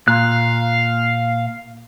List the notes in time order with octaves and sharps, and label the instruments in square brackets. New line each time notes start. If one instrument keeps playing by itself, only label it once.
[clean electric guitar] A#2 [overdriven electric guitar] F5 [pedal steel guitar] F#6